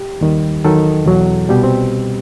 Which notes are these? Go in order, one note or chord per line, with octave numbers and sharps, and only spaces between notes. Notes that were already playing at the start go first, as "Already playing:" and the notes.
Already playing: G4
D#2 D#3 G3
E2 D#3 F#3 A4
E2 B2 F#3
C2 B2 G3 G4
C4